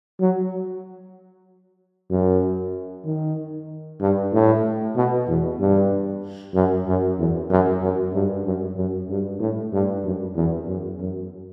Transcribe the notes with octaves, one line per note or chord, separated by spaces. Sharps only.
F#3
F#2
D#3
G2
A2
B2
E2
G2
F#2
F#2
E2
F#2
F#2
G2
F#2
F#2
G2
A2
G2
F#2
E2
F#2
F#2